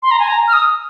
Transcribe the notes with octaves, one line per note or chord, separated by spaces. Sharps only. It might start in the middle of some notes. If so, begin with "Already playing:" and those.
C6
A#5
G#5
A#5
F6
D#6